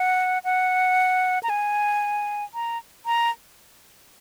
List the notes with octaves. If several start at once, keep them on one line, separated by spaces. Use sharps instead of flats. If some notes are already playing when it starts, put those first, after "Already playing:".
Already playing: F#5
F#5
A#5
G#5
A#5
A#5